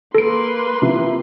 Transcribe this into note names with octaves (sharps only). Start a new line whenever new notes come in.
A#3 A4 B4 C6 D7
C3 F3 E4